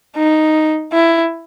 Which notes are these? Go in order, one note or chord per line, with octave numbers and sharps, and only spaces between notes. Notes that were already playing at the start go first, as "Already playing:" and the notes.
D#4
E4